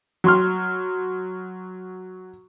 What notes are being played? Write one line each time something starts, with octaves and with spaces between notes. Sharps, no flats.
F#3 C6 F6